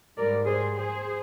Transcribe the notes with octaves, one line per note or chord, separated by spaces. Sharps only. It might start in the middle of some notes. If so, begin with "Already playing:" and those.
G#2 G3 A#4 D5
G#4 C5
G#4 C5